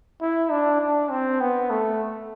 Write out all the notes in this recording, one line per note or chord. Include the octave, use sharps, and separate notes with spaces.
E4
D4
D4
C4
B3
A3